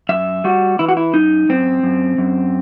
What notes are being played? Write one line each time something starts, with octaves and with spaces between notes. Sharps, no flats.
F#2 E5
G3 F#4
E3 E4
F#4
E4
F#2 D#4
F#2 C4
F#2
F#2